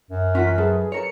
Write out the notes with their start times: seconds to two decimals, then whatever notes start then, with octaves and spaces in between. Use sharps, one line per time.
0.11 F#2
0.35 E3 C#4 F4 A#4 F#5 B6
0.58 F#3 G#4 A4 B4 A5
0.92 A4 A#4 C#5 C#7